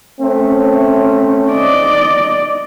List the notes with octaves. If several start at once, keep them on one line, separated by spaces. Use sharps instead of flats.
A3 C4 C#4
D5 D#5